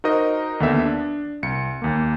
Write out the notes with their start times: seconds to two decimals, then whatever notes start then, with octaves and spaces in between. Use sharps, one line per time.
0.04 D#4 F#4 A#4 C5 D#5
0.60 D#2 D3 B3 E5
0.85 D4
1.43 C2 C#7
1.82 D#2 A#3